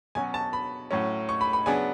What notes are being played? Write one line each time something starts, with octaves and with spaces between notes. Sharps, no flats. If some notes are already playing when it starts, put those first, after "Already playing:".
B2 F#3 C#4 G#5
A5
B5
A2 F#3 C#4
C#6
B5
B5
C#3 F#3 B3 D4 G#5